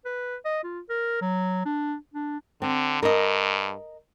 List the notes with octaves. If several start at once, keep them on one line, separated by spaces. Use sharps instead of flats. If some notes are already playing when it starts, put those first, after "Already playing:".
B4
D#5
F4
A#4
F#3
D4
D4
D3 C4
G2 A#4 D#5